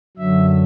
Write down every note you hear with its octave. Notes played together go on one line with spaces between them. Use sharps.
F#2 D3 F#3 E5